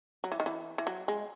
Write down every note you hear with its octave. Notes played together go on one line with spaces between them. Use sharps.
F#3
E3
D#3
E3
E3
F#3
G#3